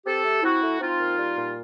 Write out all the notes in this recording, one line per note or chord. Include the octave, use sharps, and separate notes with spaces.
C4 G4 A4
A3
C4 E4 F#4
A3
C4 D#4 F4
A#2
G3
A#2